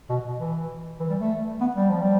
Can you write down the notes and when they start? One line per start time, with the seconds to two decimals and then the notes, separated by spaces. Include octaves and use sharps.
0.09 B2
0.39 E3
1.00 E3
1.09 G3
1.20 A3
1.61 B3
1.75 G3
1.89 F3
2.01 G3